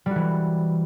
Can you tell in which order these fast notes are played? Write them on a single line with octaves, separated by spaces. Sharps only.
G3 F#4 E3